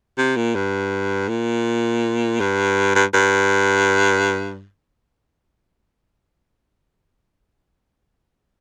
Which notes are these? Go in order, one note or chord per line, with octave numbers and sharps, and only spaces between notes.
C3
A#2
G2
A#2
G2
G2
G2